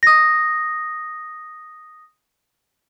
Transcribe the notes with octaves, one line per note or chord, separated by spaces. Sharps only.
D#6 A#6